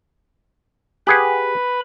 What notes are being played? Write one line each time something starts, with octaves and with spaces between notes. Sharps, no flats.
G4 G#4 B4 F#5 B5